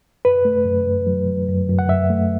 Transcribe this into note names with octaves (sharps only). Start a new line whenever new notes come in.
F#2 B4
A3
F#2
F#2
F#3
F#3
F#2
F#2
F#5
F#2 E5
A3